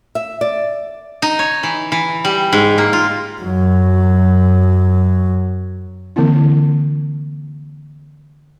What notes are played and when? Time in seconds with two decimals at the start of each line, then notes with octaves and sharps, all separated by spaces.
0.15 E5
0.41 D5
1.22 D#4
1.39 C#5
1.63 E3
1.92 E3
2.25 G3
2.53 G#2
2.78 A#3
2.93 F4
3.41 F#2 F#3
6.16 D3 E3 A#3 C4 E4